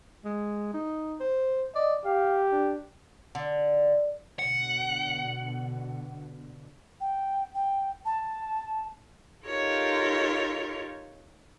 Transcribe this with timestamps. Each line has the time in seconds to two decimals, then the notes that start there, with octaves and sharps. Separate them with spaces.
0.25 G#3
0.74 D#4
1.20 C5
1.75 D5 D#5
2.05 G4 F5
2.52 D4
3.35 D3
4.39 B2 D3 F#5
7.00 G5
7.54 G5
8.05 A5
9.46 D#4 F4 G4 A4 A#4 C#5